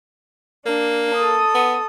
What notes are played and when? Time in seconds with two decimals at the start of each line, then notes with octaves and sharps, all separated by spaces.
0.66 A#3 D4
1.14 A4 D#6
1.55 B3